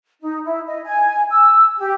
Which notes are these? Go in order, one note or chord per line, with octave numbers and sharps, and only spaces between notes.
D#4
E4
D#5
G#5
E6
G4